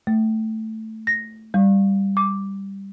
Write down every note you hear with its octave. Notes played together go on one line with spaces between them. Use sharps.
A3
A#6
G3
D6